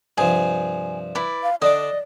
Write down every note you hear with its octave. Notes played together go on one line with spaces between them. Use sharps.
G2 C3 F3 G#4
E4 B4 D5
F5
D3 D4 D5 D#5 D6